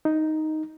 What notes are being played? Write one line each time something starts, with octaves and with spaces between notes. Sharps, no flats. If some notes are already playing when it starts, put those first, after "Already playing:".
D#4